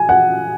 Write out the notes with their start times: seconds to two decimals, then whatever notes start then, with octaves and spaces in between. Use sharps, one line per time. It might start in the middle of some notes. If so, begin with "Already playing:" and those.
Already playing: G#5
0.09 F#5